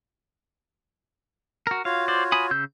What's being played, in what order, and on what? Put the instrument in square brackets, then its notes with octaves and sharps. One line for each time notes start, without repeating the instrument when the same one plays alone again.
[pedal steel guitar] F#4 A#4
[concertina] F4 F#4 C#5 [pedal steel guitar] F5
[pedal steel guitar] C5 D5
G#5 B5 D#6
C#3 E6 G6